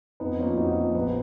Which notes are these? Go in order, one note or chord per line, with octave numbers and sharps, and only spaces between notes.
F2 B3 D#4
F3 A#3 C#4 F4
F2 D#4 F#4
F3 A#3
A#1 B3